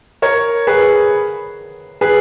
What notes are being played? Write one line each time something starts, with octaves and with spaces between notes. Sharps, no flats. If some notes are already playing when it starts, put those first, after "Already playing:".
A#4 C#5
G#4 B4
G#4 B4